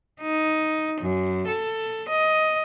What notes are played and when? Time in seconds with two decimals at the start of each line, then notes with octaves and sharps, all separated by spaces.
0.21 D#4
1.01 F#2
1.48 A4
2.09 D#5